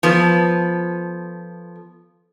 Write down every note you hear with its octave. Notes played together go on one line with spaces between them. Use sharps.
F3 B3 A4